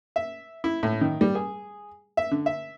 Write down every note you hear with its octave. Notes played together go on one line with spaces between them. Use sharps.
E5
E4
A2
D#3
G3
G#4
E5
D3
E5